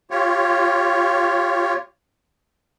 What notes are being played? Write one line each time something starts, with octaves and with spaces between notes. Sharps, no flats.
F4 G4 C#5